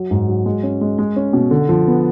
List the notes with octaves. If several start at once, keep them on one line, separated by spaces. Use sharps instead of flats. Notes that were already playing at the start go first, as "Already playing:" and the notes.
Already playing: F#3
G#2
F#3
G#3
C#4
G#3
G#3
C#4
B2
D3
F3
B3